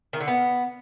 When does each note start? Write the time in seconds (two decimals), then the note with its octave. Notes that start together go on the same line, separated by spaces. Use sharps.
0.13 D#3
0.20 D3
0.28 B3